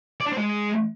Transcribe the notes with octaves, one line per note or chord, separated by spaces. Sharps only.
D5
D4
C4
G#3